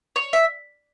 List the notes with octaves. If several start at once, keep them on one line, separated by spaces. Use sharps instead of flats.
C#5
E5